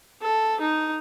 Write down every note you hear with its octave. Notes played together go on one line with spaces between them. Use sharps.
A4
D#4